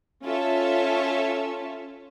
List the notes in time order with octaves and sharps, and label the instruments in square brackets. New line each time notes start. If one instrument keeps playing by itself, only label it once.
[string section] C#4 F4 A4 E5